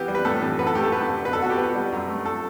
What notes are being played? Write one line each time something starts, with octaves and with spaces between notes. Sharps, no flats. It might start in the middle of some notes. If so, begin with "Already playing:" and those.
Already playing: E3 B3 G4
G3
B4
A2 A4
E3
F#2 B4
A4
A3 G4
A4
F#2 B4
D3
B2 B4
A4
B3 F#4
G4
B2 B4
G3
F#2
A3
A4